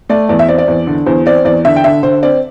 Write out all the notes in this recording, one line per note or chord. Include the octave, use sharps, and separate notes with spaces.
A3 D5
E2 D5
E5
C4 D5
D5
E2
D3
E2 C5
C4 D5
E2 D5
D3 E5
G5
D3 E5
D3 C5
C4 D5